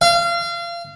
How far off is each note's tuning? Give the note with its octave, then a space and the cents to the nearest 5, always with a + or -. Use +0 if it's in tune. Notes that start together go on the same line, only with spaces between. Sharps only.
F5 -30